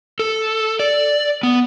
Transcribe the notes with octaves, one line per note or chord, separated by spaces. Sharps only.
A4
D5
B3